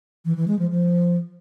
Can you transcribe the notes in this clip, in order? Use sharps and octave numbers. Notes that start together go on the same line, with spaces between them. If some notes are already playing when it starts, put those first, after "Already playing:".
E3
E3
G#3
F3
F3